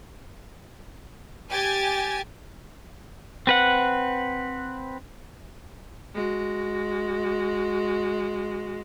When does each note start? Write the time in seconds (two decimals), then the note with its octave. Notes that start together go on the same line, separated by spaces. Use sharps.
1.51 G4 G#5 G#6 A6
3.47 C4 B4 F#5
6.15 G#3 F#4